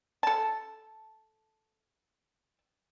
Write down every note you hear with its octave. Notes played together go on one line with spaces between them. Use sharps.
A4 A5